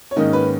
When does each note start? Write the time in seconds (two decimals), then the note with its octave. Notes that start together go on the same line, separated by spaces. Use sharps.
0.11 C#5
0.16 G#2 D#3 A#3 C#4 D#5
0.33 B4